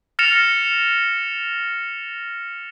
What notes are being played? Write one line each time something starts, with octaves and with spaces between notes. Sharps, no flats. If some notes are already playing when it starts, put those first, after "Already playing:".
F6 A6 A#6 C#7 E7 F7